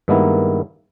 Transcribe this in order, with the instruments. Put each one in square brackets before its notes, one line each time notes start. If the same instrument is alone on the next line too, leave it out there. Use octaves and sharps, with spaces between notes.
[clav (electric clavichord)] G2 D#3 G#3 A#3 B3 E4